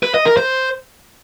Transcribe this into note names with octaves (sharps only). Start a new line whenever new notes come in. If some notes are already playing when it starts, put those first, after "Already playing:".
B4
D#5
A#4
C5